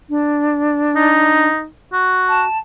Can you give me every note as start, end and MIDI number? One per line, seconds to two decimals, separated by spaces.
0.10 1.48 62
0.96 1.66 63
1.93 2.44 66
2.29 2.58 81